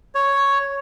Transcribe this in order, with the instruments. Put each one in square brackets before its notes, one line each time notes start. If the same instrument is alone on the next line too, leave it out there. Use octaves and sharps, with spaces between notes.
[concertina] C#5